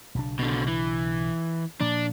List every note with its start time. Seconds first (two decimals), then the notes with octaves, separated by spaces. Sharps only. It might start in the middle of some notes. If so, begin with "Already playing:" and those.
0.15 B1 C#3 D4
0.39 B2 D3
0.67 E3
1.81 A#2 F3 A#3 D4